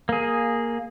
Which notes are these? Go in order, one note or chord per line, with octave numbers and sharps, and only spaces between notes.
A#3 G#4